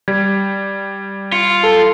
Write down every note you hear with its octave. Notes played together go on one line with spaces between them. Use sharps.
G3 G#6
F4 C#7
A4